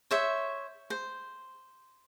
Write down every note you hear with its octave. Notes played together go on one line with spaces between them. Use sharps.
C5 C#5 E5
C5